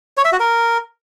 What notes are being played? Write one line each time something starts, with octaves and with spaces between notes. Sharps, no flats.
C#5
E5
F#4
A#4